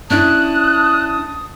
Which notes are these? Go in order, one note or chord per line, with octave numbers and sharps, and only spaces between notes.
C#4 D4 E4 A5 D#6 F#6